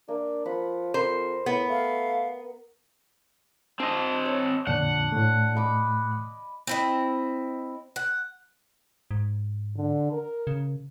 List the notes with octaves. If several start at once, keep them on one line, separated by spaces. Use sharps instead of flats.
A#3 D4
F3 F#5 B5
F2 A#4 C5 B5
A2 B3
A3 F5
C4 D#5 A5
C#5
F2 A#2 D3 D4 F#5
A2 A3
D#5 B5 D6
C4 E4 D#5
F#5
G#2
D3
A#4
C#3